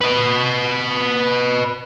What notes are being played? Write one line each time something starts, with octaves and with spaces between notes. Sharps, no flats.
B4 D#5